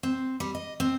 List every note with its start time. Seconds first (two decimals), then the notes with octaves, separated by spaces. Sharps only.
0.03 C4
0.40 G3
0.55 D#5
0.80 C4